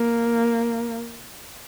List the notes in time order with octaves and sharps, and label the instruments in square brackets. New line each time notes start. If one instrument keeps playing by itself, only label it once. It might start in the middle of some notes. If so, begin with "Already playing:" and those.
Already playing: [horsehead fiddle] A#3